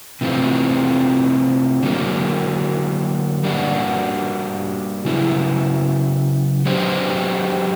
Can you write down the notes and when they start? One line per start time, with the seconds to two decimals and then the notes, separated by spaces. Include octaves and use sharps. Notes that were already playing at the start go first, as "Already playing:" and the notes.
0.21 C3 E3 A3 C4 F4
1.83 D3 F#3 A#3
3.44 G3 A#3 D4 F#4
5.05 C#3 F#3 B3 E4
6.66 F#3 B3 D4 G4 C5